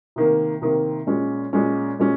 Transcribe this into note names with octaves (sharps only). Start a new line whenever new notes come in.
C3 D#3 A#3
C3 D#3 A#3
A#2 G#3 C#4
A#2 G#3 C#4
A#2 G#3 C#4